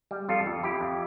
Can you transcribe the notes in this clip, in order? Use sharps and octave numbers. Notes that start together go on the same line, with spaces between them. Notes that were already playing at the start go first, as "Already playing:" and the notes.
G3
F2 F4 A4
F2
F2 E4 G4
F2